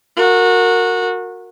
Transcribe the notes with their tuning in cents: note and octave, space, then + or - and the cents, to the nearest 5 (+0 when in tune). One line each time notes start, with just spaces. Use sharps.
F#4 -20 A#4 -20